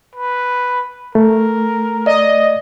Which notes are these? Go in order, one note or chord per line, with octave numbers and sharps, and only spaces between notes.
B4
A3 A#4
D5 D#5